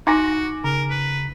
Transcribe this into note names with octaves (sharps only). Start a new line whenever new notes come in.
D#4 F#4 G#5 D6 A#6
C#3 A#4 A#5
B4